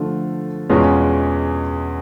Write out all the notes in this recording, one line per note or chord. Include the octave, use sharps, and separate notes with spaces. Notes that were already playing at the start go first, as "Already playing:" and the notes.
Already playing: D3 F3 A3
E2 B2 G#3 C#4 F4